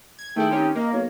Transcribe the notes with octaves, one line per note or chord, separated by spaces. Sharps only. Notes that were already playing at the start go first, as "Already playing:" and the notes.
G#6
D#3 A3 E4 G#4 G5
C4 C#4 D#4 G4
A#3 A#4 D#5
B1 A#4 C#5